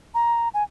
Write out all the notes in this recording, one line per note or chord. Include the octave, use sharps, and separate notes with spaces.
A#5
G#5